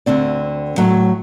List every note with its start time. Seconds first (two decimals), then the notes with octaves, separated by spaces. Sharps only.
0.06 D2 D3 C4 D5
0.77 A2 F#3 A3